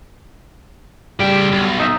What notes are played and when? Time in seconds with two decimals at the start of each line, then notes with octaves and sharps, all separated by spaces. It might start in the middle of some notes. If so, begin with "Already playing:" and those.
1.19 C#3 G3 G5
1.52 B1
1.80 D#4 E5